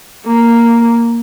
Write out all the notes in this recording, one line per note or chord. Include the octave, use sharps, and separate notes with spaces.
A#3